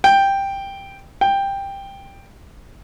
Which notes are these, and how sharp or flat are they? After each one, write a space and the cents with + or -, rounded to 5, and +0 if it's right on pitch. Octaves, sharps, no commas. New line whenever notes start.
G5 +5
G5 +10